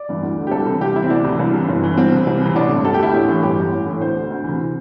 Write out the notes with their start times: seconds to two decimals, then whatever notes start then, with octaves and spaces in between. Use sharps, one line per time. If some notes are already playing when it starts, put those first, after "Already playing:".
Already playing: D5
0.09 G2 E3
0.23 D2
0.37 D3
0.47 G4
0.51 C2 A4
0.66 C3 E3
0.81 C2 G4
0.96 C3 E3 E4
1.03 C4
1.10 D2 D4
1.24 C3 E3
1.40 C2
1.54 C3 E3
1.69 G1
1.83 G2 E3
1.97 C2 C4
2.12 C3 E3
2.27 C2
2.41 C3 E3
2.55 A1 D4
2.70 G2 D3
2.85 D2 A4
2.94 G4
2.99 D3 E4
3.12 A1 G4
3.28 A2 E3
3.43 G1 G4
3.57 G2 E3
3.72 A1
3.86 A2 E3
4.01 D2 C5
4.15 D3
4.31 D2
4.44 C3 E3